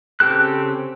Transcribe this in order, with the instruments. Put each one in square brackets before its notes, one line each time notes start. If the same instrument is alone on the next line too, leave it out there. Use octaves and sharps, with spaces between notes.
[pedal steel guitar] C#3 C4 G4 A4 F#6